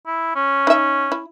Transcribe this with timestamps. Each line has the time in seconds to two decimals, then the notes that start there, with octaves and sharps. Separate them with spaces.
0.07 E4
0.35 C#4
0.67 D#4 E5
1.12 E4